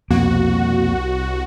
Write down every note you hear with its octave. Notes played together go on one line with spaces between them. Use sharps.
C2 F2 B2 A#3 B3 F#4